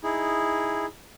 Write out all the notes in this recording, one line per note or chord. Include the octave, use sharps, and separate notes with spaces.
D#4 E4 G#4